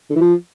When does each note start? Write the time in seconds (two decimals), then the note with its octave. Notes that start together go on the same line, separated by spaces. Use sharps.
0.10 D3
0.15 E3
0.21 F3